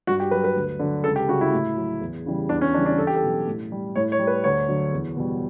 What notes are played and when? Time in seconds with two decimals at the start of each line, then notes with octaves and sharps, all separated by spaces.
0.07 G2 F#4
0.20 G4
0.31 F#3 B4
0.44 B4
0.55 D2
0.79 D3 F#3
1.04 C#2 A4
1.16 G4
1.28 C#3 F#4
1.32 G3
1.41 E4
1.53 A2
1.77 F#3
2.01 E2
2.26 C#3 E3 G3
2.49 E2 D4
2.61 C#4
2.74 C#3 E3 G3 D4
2.86 D4
2.98 E2 A4
3.07 G4
3.16 A4
3.23 B2 F#3
3.47 A2
3.72 G3
3.96 A2 C#5
4.12 C#5
4.19 G3
4.27 B4
4.44 D2 C#5
4.69 D3 F#3
4.93 E2
5.17 B2 G3